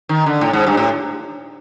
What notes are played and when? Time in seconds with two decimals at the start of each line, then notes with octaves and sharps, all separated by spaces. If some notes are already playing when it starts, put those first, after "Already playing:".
0.09 D#3
0.26 D3
0.41 A2
0.53 G#2
0.67 G2
0.77 A2